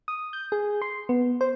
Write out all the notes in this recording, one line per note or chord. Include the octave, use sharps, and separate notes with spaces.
D#6
G6
G#4
C6
B3
C5